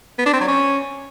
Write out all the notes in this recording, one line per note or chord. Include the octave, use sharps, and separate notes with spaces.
B3
D4
C4
F#3
C#4